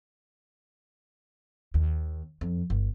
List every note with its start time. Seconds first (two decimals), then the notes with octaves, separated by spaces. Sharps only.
1.74 D#2
2.41 F2
2.70 G1